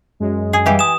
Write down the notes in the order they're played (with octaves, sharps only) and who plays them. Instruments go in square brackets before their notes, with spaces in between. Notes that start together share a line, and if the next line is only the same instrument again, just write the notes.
[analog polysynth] F#2 G#3
[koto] G#4
[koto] E3 G4 [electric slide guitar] G3 F5 G#5
[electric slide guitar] G#5 [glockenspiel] D#6 E7